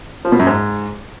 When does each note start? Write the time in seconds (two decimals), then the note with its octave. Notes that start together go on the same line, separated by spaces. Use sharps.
0.25 F3
0.32 B2
0.39 F#2
0.47 G#2